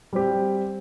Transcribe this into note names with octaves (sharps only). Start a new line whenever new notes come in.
G3 C4 G4